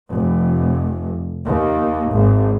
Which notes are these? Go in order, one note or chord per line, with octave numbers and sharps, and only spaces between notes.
F1
D#2
G#1